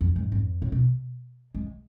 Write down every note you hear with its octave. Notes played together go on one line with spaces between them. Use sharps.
F2
G#2
F2
A2
B2
G#3